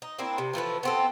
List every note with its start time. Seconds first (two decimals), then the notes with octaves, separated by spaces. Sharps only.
0.02 D#4
0.18 A#3 C4 D4 E4
0.38 C3
0.53 E3 F3 A3 B4
0.83 B3 C4 A4